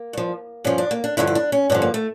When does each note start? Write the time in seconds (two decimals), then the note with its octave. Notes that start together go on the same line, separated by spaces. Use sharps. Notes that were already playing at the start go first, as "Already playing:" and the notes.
Already playing: A#3
0.13 G2 F3
0.64 G2 F3 C#4
0.78 D4
0.91 A#3
1.04 D4
1.17 G2 D3 F3 E4
1.27 E4
1.35 D4
1.52 C#4
1.70 G2 D3 F3 C#4
1.82 A#3
1.94 A3